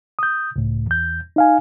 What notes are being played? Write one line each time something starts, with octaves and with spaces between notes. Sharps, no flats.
D#6 G6
C#2 A2
E2 G6
D#4 F5 G#5